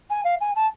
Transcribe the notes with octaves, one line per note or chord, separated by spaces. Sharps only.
G#5
F5
G#5
A5